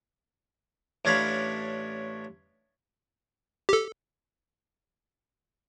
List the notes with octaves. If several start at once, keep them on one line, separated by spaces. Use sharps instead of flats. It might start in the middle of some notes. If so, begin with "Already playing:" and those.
A1 C#4 D4 C#5 F5 B5
G4 A4